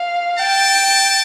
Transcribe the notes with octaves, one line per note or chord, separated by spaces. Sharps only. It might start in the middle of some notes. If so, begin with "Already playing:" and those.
Already playing: F5
G5 A5